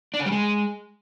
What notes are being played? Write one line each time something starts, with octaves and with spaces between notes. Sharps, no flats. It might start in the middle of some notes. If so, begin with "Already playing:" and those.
D4
C#3
G3
G#3